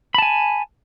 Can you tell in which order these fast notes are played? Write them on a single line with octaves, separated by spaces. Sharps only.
B5 A5 G#5